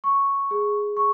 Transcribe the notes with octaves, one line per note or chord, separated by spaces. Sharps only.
C#6
G#4
C#6